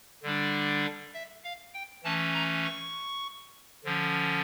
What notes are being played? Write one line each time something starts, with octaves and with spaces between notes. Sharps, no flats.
D3 G3 D4
E5
F5
G5
E3 A3 C#4 A5
A#5
C#6
D3 F3 C#4